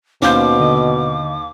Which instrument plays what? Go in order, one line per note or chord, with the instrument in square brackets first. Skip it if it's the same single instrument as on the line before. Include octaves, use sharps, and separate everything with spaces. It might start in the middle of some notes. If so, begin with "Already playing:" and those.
[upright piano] D#2 F5 G6 [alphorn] B2 [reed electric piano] C#4 C5 [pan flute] D6
[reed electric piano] D3 D#5